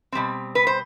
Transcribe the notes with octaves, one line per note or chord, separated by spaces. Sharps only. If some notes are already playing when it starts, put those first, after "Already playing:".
B2 G3 C4
B4
C5